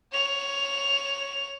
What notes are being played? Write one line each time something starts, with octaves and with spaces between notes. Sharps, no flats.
C#5 F7